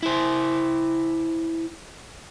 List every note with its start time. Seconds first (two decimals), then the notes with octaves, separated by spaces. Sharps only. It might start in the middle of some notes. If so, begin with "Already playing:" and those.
0.03 E4 C5